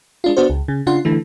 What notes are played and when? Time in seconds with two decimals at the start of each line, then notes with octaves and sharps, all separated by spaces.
0.24 G#3 D4 F4
0.37 B3 D4 F#4 C5
0.50 C#2
0.68 C#3
0.87 C#3 D4 F4 F#5 C6
1.05 D3 E3 A3